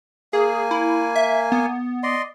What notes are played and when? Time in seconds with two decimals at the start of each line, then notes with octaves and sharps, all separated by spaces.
0.33 A#3 G#4 G#5
0.71 E4
1.16 E5
1.52 B3
2.03 D5 D#5 C6